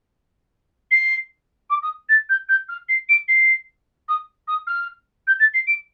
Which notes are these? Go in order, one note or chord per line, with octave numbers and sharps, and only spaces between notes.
C7
D6
D#6
A6
G6
G6
F6
C7
D7
C7
D#6
D#6
F6
G6
A6
C7
D7